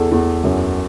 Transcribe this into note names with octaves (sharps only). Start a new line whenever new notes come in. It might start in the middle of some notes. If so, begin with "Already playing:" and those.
Already playing: E2 A4
E2
F#2